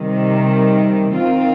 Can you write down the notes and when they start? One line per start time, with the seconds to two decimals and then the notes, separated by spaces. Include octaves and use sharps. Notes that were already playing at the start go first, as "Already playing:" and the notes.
Already playing: C3 D#3 G3
1.15 D#3 C4 F4